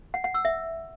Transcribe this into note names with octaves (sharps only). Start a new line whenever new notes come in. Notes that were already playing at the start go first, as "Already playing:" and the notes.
F#5
F#5
E6
E5